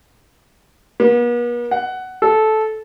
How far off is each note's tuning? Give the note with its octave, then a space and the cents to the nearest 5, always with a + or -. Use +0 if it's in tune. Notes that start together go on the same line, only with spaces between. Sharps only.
B3 -45
F#5 +10
A4 -15